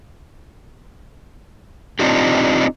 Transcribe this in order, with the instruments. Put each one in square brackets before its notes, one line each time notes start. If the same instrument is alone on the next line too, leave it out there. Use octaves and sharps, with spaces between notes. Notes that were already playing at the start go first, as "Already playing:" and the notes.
[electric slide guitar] C4 D4 D#4 F4 G4